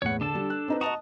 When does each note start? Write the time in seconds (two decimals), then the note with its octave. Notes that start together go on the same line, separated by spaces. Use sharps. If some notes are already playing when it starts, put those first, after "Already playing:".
0.02 E2 A2 C#5 F#5
0.21 D3 D4 A4 A5
0.35 G3
0.50 F#6
0.68 C4 D#4 B4
0.81 F#4 D#5 A5 A#5 D#6